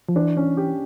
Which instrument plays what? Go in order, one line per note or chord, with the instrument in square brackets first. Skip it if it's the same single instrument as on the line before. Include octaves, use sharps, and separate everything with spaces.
[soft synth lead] F3
[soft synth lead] E3 [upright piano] D4
[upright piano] C#4
G4